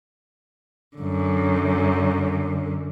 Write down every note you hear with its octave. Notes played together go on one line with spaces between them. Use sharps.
F#2 D3